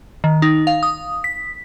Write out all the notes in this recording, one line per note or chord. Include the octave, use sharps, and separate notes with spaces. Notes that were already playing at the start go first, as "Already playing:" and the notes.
D#3
D#4
F5
D#6
B6